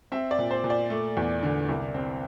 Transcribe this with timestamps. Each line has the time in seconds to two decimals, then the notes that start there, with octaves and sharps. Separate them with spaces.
0.12 C4 E5
0.31 D5
0.39 A#2
0.51 C5
0.64 A#2
0.70 D5
0.90 A3
1.17 E2
1.43 D3
1.69 C2
1.94 C4